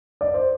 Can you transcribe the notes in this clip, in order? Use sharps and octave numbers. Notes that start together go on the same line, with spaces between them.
D5
C5